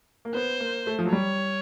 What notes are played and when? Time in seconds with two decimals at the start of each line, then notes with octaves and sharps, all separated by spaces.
0.25 A#3
0.35 B3 C5
0.60 A#3
0.87 A3
0.99 F3
1.05 F#3
1.13 G3 C#5